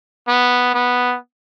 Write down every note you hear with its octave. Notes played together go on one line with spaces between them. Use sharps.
B3
B3